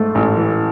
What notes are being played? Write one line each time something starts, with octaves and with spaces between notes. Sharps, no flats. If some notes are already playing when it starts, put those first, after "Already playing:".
Already playing: G#2 A3
A1
E3